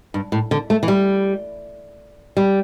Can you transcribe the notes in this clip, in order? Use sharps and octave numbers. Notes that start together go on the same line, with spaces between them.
G2
A2
D3
A3
E3
G3
G3